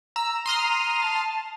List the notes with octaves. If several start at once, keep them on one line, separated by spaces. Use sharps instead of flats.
A#5 E6
C6 D#6 F6
A5